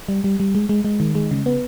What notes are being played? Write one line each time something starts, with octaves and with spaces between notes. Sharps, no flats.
G3
G3
G3
G#3
G#3
G#3
D#3
G#3
C#3
B3